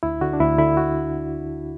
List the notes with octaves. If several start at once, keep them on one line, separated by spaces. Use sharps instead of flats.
D2 E4
D3 F#4
D4
D2 E4
D3 E4
F#4